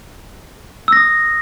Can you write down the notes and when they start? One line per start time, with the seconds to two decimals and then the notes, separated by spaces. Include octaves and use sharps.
0.88 E6
0.92 A#6
0.97 D#6